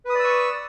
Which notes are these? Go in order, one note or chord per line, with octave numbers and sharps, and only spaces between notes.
B4 D5 C#6 D#6 E6